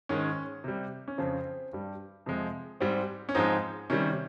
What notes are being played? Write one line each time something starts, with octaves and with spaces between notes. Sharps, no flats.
G#2 D#3 G#3 C#4
C3 G3
C#4
F2 C#3 F3 C4
G2 G3
F2 C3 F3 G#3
G#2 G3 C4
C#4
G#2 F3 G#3 C4 D#4
C3 D#3 G3 C#4